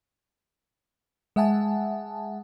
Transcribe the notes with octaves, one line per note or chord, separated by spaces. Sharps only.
G#3 E5 F#5 G#5 A5